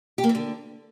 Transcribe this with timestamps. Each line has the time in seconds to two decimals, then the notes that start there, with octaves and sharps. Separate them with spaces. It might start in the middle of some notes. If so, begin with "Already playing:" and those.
0.18 G4
0.24 A#3
0.29 E3
0.35 D3